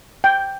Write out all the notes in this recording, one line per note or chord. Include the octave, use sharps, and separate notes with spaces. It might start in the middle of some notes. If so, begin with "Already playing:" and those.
G5